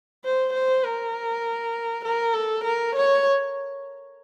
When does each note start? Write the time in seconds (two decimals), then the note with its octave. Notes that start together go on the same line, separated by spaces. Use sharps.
0.24 C5
0.53 C5
0.84 A#4
2.05 A#4
2.34 A4
2.64 A#4
2.95 C#5